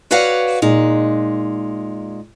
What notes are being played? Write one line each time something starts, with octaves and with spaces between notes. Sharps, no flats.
F#4 B4 C#5 D5 F5 F#5
A#2 G#3 D#4